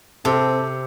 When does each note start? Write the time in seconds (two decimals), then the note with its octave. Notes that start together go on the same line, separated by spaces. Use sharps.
0.25 C3 C4 A4